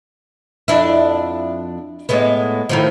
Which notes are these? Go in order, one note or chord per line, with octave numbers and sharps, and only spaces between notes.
F2 D4 E4
A2 G#3 B3
A2 D#3 F3